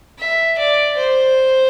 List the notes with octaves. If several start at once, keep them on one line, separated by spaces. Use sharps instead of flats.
E5
D5
C5